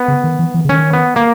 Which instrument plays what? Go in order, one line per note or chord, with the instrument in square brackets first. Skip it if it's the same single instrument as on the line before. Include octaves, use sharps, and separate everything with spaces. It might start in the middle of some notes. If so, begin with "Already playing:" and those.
Already playing: [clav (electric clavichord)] B3
[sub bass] C#3
D#3
E3
E3
C#3
[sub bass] D#3 [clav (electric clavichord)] C#4
[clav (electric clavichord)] B3
A#3